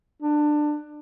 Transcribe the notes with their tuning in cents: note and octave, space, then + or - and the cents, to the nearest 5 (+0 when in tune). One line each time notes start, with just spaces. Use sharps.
D4 +20